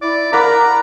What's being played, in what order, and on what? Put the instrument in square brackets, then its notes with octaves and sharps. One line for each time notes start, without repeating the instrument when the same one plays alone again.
[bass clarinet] E4 [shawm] D5
[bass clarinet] A#4 [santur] D5 F#5 B5 [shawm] A#5